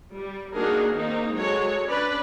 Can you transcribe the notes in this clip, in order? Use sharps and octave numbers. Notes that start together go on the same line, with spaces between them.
G3
A#3 D4 D#4 F#4 G#4 A#4
D#3 A#3 C4 D#4
F#3 G#3 F#4 A4 C#5
C#4 D4 B4 D5